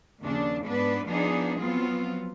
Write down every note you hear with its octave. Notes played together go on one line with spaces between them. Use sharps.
D#2 C#3 F3 D4
G#2 B3 D4 B4
F3 B3 D4 D#4 G#4
F3 F#3 B3 C4 F4